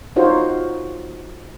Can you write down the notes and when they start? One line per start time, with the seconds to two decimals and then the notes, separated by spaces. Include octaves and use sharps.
0.16 D#4 F4 F#4 C5 C#5